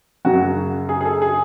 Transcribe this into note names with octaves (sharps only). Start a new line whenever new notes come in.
F#2 C#3 F#3 F#4
G#4
G#4
A4
G#4